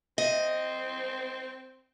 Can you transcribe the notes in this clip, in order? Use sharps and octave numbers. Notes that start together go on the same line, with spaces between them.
C4 D#5